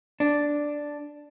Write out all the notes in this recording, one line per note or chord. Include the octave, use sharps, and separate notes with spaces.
D4